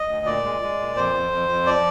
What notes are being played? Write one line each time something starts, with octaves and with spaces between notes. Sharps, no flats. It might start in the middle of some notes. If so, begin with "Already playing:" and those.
Already playing: D#5
D2
A#2 D5
G#3
G#3
A#2
F2 C5
F2
F2
F2
F3 D5